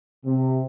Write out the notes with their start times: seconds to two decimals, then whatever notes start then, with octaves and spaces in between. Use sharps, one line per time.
0.25 C3